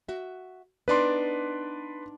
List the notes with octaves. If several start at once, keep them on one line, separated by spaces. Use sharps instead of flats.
F#4 E5
B3 D4 D#4 B4 D5 C6